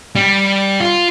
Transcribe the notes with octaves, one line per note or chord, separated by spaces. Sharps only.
G3
F4